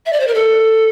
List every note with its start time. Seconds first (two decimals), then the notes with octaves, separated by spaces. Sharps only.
0.06 E5
0.12 D5
0.20 C5
0.27 A#4
0.34 A4